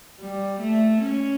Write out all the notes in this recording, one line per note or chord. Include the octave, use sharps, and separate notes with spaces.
G3
A3
C#4